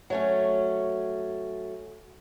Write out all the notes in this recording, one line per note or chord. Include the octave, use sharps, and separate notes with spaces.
F#3 A3 C#4